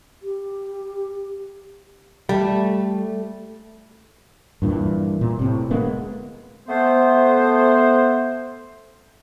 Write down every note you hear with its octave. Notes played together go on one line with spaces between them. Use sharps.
G4
G3 A3
G2 A#2 E3
A#2
A2 C3
D2 G#3 A#3 B3
A3 B3 C5